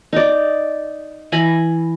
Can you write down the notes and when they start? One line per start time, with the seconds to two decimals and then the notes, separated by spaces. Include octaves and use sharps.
0.13 D#4 D5
1.32 E3 G#5 A#5 B5